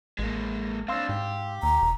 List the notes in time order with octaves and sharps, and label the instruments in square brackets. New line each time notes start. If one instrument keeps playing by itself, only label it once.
[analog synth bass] A1 [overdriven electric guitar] G#3 A#3
[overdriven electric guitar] C4 D4 [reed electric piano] F5 C6 E6
[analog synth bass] G#2 [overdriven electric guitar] G4
[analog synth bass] D#2 [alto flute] A#5
[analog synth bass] E1